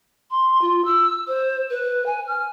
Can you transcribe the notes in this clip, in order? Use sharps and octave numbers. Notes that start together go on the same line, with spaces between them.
C6
F4
E6
C5
B4
G#5
F6